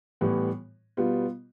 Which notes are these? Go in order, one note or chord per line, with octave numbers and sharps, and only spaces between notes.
A2 E3 G3 B3
B2 G3 B3 F4